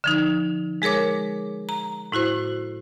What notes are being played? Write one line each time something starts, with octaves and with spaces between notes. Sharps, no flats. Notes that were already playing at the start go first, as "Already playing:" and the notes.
D3 F3 D#4
G#3 G#4 A#4 C#5 D6
A#5
A2 E4 F#4 C5